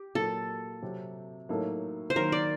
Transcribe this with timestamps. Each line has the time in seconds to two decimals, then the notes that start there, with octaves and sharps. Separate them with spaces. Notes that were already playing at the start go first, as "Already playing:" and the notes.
Already playing: G4
0.15 A#2 F#3 A#3 A4
0.82 C3 F#3 C4 G4
1.49 A2 F#3 A#3 D#4 A4
2.10 C5
2.16 D#3 F#3 A#3 A#4
2.32 D5